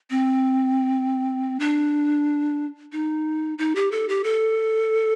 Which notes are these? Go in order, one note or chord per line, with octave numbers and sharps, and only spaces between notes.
C4
D4
D#4
D#4
G4
A4
G4
A4